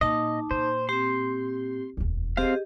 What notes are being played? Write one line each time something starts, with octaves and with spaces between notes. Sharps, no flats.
A#2 D#4 D#5 A5 D6
A#2 C5
C4 G4 C6
E1 D2
C4 G4 G#4 D#5 F5